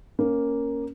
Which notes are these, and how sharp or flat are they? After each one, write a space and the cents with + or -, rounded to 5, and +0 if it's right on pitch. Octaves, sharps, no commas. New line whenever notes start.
A#3 +0 C#4 +0